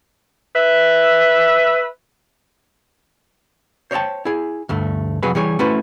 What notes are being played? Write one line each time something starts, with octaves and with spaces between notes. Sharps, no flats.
B4 E5
C5 C#5 D#5 G5 A5
E4 G#4
D2 G2 A3
C2 F2 F#3 G#4 B4
E3 G3 G#4 C#5
A3 C#4 E4 F#4 B4 C5